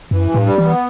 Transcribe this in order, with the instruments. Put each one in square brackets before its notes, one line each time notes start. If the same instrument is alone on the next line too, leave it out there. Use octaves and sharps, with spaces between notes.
[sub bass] F#2 [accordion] E3
[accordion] G2
[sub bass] A2
[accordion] G3
[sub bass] E3
[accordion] B3